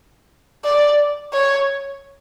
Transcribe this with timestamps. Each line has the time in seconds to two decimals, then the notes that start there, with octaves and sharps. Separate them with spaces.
0.64 D5
1.33 C#5